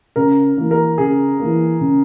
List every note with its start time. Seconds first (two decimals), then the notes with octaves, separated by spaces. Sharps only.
0.16 C#3 A#4
0.57 E3 A#3
0.71 A#4
0.98 C#3 G#4
1.39 E3 A#3
1.81 C#3